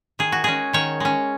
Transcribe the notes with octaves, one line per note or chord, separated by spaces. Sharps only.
D#3 G#4
F#4
G#3 C#4 G#4
D#3 C#5
G#3 C#4